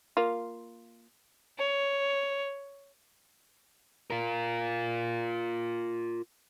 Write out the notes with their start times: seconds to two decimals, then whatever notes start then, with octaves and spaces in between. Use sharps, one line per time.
0.17 A#3 F4
1.58 C#5
4.10 F4 A#4